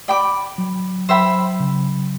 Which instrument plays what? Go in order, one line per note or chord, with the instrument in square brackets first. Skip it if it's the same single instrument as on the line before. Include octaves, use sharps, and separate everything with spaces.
[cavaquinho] D5 G5 B5 D6
[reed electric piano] F#3
[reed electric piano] F#3 [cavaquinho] C5 E5 G5 B5
[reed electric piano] C#3